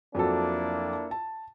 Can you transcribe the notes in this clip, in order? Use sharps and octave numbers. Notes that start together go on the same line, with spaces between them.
F2 F#3 A#3 D4 E4 F4 A4
A5